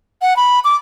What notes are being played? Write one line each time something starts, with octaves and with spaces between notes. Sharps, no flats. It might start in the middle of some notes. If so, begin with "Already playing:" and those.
F#5
B5
D6